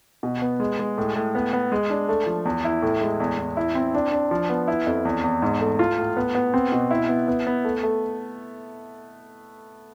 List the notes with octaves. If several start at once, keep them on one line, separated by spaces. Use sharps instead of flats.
B2
B3
G#3
G#3
A2
A2
B3
B3
G#3
D4
A3
F3
E2
E4
A2
G#3
E2
E2
E4
C4
D4
D4
F3
B3
E4
F2
E2
E2
G#2
A3
F4
A2
B3
B3
C4
B2
E4
B3
B3
B3
A3
A3